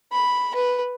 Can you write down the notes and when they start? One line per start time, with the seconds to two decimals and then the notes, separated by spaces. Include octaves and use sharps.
0.12 B5
0.55 B4